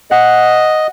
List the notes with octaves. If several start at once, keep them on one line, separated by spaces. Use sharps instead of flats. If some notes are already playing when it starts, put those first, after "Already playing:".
D#5 F#5